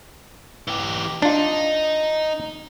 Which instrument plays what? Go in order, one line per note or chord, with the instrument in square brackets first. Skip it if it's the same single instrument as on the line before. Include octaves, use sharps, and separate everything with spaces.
[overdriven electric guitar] E3 G4
[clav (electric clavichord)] D4 F4 [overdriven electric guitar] D#4